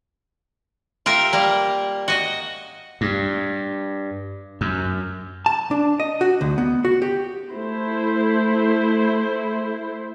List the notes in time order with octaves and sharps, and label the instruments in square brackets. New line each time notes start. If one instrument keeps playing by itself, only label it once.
[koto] F4 G4 A#4 E5
G3 A#3
F#4 D#5
[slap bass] G2
F#2
[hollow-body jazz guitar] A5
D4
D#5
F#4
D2
B3
F#4
G4
[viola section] A3 E4 C5